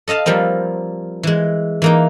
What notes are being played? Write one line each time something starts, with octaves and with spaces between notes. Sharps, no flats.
A4 D#5 F5 A5
F3 G3 A#3 C4
E3 G#3
E3 A#3 D#4